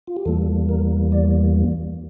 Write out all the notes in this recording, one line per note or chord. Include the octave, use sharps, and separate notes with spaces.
F4
G4
E2 E3 G3 A#3 A4
A#4
D5